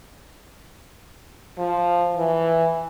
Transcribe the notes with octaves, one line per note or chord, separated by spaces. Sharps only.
F3
E3